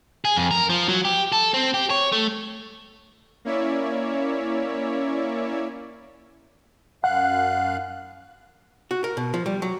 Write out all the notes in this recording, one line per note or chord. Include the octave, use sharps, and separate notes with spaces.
G#4
F2
A#4
F3
F#3
G4
A4
C4
G4
C#5
A3
A#3 C#4 E4 C#5 D5 E5
F#2 F5 F#5 F#6
F#4
A#4
B2
F3
G3
F#3